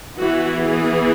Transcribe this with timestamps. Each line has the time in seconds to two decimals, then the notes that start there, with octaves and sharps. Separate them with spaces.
0.17 E3 B3 F#4
0.59 G#4